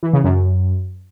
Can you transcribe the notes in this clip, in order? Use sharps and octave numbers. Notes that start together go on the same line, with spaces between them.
E3
C#3
F#2